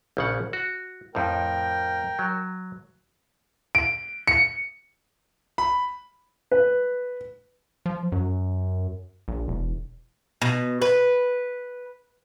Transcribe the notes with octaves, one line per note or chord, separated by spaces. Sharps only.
A#1 C#3 F#5
F#4
F2 A2 A#4 G5
F#3
D7
C#7
B5
B4
F3
F#2
A#1
E1
B2
B4